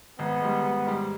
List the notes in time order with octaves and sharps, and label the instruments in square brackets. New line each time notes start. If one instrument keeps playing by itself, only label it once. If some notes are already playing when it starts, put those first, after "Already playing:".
[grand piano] G#1 [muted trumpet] B3
[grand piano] G#2 G3
G#1
G#2 G3